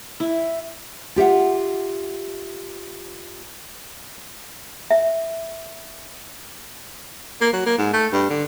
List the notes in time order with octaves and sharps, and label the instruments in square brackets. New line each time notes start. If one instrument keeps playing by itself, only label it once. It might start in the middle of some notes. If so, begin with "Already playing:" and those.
[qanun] E4
[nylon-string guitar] F4 G4 E5 F#5
[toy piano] E5
[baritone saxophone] A#3
F#3
A#3
G#2
A3
G2
D3